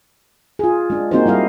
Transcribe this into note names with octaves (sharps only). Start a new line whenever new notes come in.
F4 G#4
G#3 D4
A#3 C4 D#4 F#4 G#4 C5
G3 E4 D#5 F5